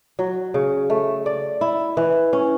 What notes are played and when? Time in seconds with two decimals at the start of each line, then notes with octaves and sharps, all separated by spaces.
0.19 F#3
0.54 C#3
0.90 A3
1.26 D5
1.61 E4
1.97 E3
2.33 C#4